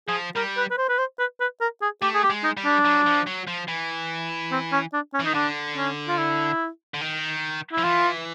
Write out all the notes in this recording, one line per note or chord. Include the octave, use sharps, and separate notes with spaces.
F3 G#4
G3 A#4
B4
B4
C5
B4
C5
B4
B4
A#4
G#4
A3 G4
G#4
G4
G#3
D#4
G3
D4
F#3
F3
F#3
F3
E3
C4
C#4
D4
C#4
E3
D#3 D#4
D3 D4
C#4
F4
E4
D3
D#3
E4
F3
E3 F4